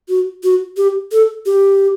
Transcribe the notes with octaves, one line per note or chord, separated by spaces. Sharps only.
F#4
F#4
G4
A4
G4